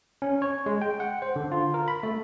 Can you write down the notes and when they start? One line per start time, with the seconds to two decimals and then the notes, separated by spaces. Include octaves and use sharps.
0.22 C#4
0.42 C#5
0.66 G#3
0.82 G5
1.00 F#5
1.22 C5
1.36 D3
1.52 F4
1.74 A#4
1.88 B5
2.03 A3